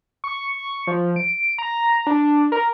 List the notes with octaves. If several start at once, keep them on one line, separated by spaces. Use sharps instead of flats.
C#6
F3
D7
A#5
D4
A#4